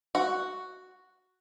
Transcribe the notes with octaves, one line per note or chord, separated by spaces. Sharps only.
F#4